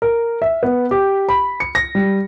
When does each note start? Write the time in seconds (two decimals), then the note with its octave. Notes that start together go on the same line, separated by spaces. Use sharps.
0.02 A#4
0.42 E5
0.63 B3
0.91 G4
1.29 B5
1.60 C#7
1.75 A#6
1.95 G3